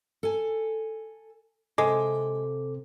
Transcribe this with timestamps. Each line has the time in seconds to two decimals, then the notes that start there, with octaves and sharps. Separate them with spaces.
0.23 A4 G#5
1.78 C3 G#3 A4 D6